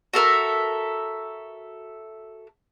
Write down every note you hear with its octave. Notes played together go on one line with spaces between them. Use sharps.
F#4 A4 A#4 E5